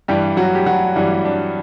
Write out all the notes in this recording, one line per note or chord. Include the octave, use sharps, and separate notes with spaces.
G2 E3 G3 G4
F#3 F#4
G4
F#3 F#4
G2 E3 G3
D4